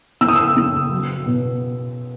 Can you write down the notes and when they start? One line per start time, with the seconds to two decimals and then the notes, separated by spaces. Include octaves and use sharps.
0.21 C#3 E6
0.28 D#6
0.36 E6
0.56 C#3
0.91 F#3
1.26 B2